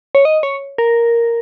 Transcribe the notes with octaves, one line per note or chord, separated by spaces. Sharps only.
C#5
D#5
C#5
A#4